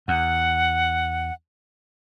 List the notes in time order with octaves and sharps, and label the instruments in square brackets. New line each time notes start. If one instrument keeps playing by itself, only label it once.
[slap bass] E2 [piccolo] F#5